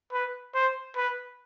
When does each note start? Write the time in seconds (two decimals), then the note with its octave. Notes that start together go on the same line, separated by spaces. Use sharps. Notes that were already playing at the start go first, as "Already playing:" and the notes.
0.12 B4
0.54 C5
0.96 B4